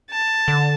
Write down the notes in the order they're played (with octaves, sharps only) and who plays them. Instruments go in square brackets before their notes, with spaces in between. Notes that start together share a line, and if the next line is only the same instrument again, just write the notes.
[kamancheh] A5
[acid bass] D3